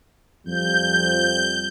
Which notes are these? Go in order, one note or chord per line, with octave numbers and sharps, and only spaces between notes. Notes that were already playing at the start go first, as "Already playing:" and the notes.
F2 F3 G3 G6